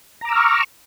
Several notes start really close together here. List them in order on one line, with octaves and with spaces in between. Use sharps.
A#5 D6 E6 F6 C#6